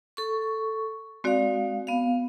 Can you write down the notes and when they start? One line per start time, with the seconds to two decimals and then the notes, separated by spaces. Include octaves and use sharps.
0.17 A4 C#6
1.24 G#3 C4 F#4 D5 F5
1.87 B3 F5